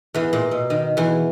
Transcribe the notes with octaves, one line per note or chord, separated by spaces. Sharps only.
E2 E3
A#2
B2
D#3
E2 E3